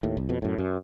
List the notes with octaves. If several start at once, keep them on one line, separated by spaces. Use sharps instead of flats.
D#2 A2
C2
F2 B2
F#2 A2
F#2